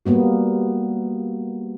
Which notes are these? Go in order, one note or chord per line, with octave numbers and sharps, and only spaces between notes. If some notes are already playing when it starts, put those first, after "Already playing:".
G3 A#3 B3 F#4